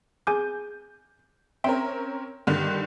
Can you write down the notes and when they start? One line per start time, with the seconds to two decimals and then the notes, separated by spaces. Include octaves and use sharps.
0.27 G#4 G#5 D6 G6
1.64 C4 C#4 A#4 E5 G5 C6
2.47 G2 D3 D#3